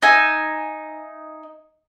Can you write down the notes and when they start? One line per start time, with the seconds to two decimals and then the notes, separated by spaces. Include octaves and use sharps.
0.02 D#4 E5 G#5